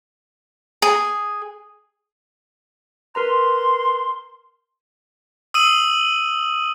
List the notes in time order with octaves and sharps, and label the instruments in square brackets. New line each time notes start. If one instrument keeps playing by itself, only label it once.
[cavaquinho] G#4
[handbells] A#4 B4 A#5 [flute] C6
[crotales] D#6 E6 D#7 F#7